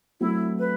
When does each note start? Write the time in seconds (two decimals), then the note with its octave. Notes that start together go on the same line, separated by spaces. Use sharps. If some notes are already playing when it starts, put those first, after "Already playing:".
0.20 F#3 A3 C4 E4
0.59 B4